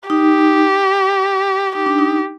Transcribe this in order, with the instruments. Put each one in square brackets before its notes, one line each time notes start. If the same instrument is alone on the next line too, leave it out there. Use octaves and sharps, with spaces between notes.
[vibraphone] D#4 [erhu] G4
[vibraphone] D#4 [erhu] G4
[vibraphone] D4
D#4